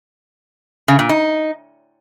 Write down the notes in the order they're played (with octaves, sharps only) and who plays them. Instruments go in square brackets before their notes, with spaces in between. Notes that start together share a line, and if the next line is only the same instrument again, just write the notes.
[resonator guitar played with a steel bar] C#3
A#2
D#4